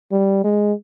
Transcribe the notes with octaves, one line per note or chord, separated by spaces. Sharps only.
G3
G#3